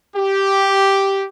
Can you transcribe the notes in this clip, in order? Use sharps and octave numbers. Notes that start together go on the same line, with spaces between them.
G4